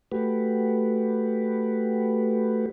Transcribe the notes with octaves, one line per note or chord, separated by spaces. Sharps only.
A3 F#4 G4 B4